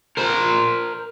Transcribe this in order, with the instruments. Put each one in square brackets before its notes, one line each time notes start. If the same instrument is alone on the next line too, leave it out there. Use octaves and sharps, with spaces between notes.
[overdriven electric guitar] A#4 C5